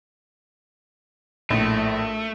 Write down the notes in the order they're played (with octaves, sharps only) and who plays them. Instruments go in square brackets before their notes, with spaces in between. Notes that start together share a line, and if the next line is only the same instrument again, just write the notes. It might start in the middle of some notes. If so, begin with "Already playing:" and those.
[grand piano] A#1 A2 [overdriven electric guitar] A3